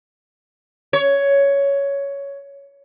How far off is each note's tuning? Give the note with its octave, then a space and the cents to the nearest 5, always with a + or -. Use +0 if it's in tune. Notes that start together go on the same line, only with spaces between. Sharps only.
C#5 +10